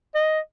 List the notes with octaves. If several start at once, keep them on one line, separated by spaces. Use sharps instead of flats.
D#5